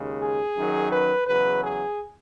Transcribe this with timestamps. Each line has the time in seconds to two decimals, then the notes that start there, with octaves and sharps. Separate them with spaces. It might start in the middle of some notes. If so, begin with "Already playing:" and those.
Already playing: D#2 C#3 G#3
0.20 G#4
0.55 F#2 D#3 F#3
0.90 B4
1.26 E2 C#3 F#3 B4
1.62 G#4